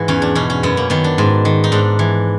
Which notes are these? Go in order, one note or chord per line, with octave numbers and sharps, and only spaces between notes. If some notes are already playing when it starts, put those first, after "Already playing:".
Already playing: G#2 E3 F#4
E2 C#4
D4
B2 C#4
C#4
F#2 B3
A#3
D#3 B3
D4
G#2
D#3
D#4
G#2 D4
E3